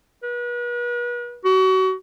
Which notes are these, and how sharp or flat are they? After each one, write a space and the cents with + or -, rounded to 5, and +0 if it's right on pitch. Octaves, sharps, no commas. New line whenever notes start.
B4 -40
F#4 +30